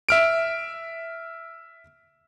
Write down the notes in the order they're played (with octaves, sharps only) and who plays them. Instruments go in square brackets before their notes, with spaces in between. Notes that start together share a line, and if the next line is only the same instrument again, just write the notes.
[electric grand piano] E5 F6 D7